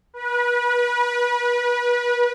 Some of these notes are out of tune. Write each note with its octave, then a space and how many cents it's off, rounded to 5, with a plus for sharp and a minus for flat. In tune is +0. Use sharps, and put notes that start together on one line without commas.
B4 -30